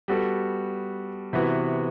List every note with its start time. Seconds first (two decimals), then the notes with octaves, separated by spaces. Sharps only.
0.08 G3 B3 F#4 A4
1.33 C3 E3 B3 F#4